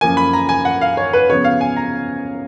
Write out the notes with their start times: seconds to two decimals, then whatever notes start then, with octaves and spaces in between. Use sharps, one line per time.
0.01 F#2 F3 A#3 G#5
0.17 B5
0.33 A#5
0.49 G#5
0.65 F#5
0.81 F5
0.97 C#5
1.13 B4
1.29 C#3 F3 B3 C#5
1.44 F5
1.61 G#5
1.77 A#5